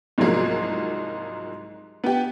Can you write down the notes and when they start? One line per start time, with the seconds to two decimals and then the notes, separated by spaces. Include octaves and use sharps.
0.18 C2 G#2 F3 F#3 A#3 G#4
2.04 B3 G4